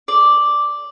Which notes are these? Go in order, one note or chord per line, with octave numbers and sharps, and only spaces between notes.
D5